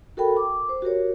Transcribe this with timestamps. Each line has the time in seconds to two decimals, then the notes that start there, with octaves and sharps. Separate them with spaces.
0.17 F#4 A4 A#4 G5 B5
0.37 D6
0.69 C5
0.82 F#4 G4 A#4 C#5